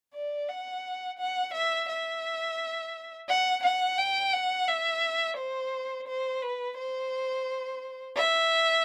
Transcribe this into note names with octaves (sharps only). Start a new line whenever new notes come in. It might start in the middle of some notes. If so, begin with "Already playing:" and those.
D5
F#5
F#5
E5
E5
F#5
F#5
G5
F#5
E5
C5
C5
B4
C5
E5